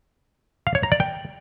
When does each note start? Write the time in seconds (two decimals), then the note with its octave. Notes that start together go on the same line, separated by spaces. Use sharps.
0.67 F5
0.75 C#5
0.83 A#5
0.92 D5
1.00 G5